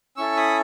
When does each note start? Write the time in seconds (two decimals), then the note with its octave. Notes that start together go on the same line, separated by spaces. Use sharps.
0.17 C#4 E4 A4 C#6 E6
0.37 B5 D#6